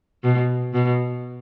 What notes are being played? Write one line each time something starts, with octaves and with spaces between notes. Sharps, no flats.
B2
B2